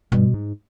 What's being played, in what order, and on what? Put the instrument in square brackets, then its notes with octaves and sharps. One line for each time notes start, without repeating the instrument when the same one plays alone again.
[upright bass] G2 [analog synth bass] B2
[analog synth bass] G#2